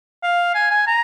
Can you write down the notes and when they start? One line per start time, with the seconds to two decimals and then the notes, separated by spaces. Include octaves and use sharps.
0.23 F5
0.55 G#5
0.71 G#5
0.87 A#5